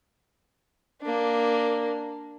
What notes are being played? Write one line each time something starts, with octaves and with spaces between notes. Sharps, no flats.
A#3 D4